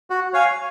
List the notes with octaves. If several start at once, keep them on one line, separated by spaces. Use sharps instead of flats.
F#4
C#5 F5 G#5